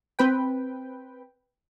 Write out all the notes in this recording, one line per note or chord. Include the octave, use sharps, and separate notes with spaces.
C4 B4 G5